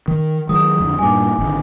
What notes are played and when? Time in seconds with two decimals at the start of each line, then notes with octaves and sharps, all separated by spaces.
0.08 D#3
0.49 D#3 F#3 G#3 D#6
0.80 F2 D3
0.99 G2 A#2 G#5 D6
1.39 G#1 D3